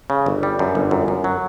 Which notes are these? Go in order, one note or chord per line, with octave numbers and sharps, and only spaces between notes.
C#3
G1
G3
F#2
G1
F#2
F#2
F#3